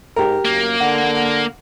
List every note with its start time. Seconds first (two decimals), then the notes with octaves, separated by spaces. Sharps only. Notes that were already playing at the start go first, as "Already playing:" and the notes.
0.16 G#2 G4 A#4
0.45 F#2 A#3
0.80 D3 F#5